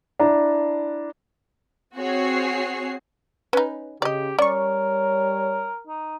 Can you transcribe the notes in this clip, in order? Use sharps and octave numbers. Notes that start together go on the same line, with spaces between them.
D4 E4 A#5
C4 F#4 G#4 C#5 C7
C#4 D#4 B4
C#3 G4 D5 D#5
G3 C#4 A#4 C#5 D5 C#6
D#4